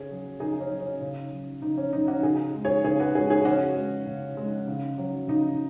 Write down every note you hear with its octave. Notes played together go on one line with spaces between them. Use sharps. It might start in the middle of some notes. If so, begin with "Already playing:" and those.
Already playing: C#3 G#4 C#5
F#3
C#3 D#4 G#4
C#4
F#3
C#4
C#3
F#3
C#3 D#4
C#4
F#3 D#4
C#4 F#4
C#3 D#4 G#4
G#3
G#4 C#5
C#3 G#4 C#5
F#4 B4
G#3 G#4 C#5
G#4 C#5
C#3 C#4 F#4
G#3
C#3
G#3
C#3
F#3
C#3 D#4